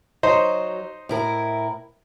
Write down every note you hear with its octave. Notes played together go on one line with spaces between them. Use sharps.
F#3 D#4 C5
A2 E4 A#4